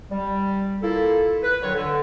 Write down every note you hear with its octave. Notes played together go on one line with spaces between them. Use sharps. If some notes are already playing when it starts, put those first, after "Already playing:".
G3
A#3 E4 F4 A4
B4
D3 D#3 F#3 F4 C#5
D3